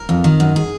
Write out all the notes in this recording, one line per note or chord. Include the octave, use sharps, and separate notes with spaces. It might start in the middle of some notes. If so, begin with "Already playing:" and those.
Already playing: A#4
F2
D#3
F#2
G#4